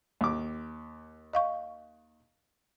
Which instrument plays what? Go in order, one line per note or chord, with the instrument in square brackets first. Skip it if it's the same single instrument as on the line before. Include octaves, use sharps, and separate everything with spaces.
[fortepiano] D#2 D6
[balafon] D#5 F5 C#6